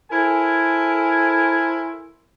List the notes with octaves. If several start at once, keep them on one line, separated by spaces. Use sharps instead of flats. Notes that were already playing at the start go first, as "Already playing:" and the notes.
E4 A4 A#4 C5 G#5